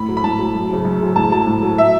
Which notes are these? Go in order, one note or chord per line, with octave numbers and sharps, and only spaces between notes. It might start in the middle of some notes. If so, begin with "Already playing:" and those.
Already playing: A2 B5
F#3
B5
A2 A5
F#3
F#2
C#3 F#3
F#2
C#3 F#3
A2 A5
F#3 A5
A2
F#3
E5